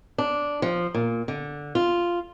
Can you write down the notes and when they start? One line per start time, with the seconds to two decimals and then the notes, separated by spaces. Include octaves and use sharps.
0.18 D4
0.62 F3
0.94 A#2
1.28 D3
1.75 F4